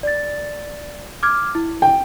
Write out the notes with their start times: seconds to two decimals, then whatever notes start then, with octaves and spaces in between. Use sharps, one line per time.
0.03 D5 A6
1.23 D6 F6 G#6
1.55 E4
1.82 G5